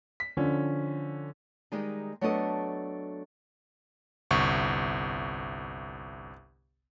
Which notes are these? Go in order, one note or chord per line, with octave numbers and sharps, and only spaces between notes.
B6
D3 F3 C#4
D#3 G3 G#3 D#4
F#3 A3 B3 D4 A4 D#5
G1 C2 C#6